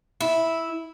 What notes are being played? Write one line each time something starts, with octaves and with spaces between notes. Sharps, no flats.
E4